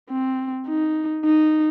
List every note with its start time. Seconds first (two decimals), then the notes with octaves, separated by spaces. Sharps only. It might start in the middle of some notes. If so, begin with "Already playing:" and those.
0.10 C4
0.68 D#4
1.24 D#4